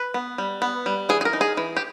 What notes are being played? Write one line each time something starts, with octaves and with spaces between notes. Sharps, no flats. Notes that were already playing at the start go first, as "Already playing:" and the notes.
Already playing: B4
B3
G3
B3
G3
E3 G#4
G#4
A#4
D#4
G#4
E3
G4